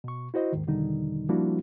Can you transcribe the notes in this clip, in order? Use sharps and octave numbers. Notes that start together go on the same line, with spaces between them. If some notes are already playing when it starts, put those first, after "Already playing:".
B2 C#6
E4 F#4 C5 D#5
D#2 G#2 D#3
E2 B2 D3 D#3 G3 D#4
F3 G3 A#3 D4 E4 F#4